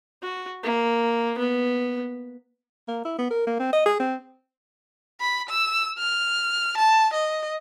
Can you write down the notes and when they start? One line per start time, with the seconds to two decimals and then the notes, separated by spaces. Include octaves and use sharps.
0.22 F#4
0.63 A#3
1.38 B3
2.88 A#3
3.05 E4
3.19 B3
3.30 A#4
3.47 A#3
3.59 C4
3.73 D#5
3.86 G#4
4.00 C4
5.21 B5
5.50 E6
5.99 F6
6.77 A5
7.14 D#5